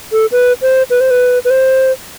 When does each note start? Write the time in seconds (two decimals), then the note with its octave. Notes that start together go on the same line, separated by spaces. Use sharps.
0.12 A4
0.32 B4
0.62 C5
0.90 B4
1.01 C5
1.11 B4
1.45 B4
1.50 C5